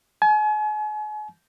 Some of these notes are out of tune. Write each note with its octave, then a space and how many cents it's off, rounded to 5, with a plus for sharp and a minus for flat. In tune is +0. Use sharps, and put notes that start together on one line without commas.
G#5 +40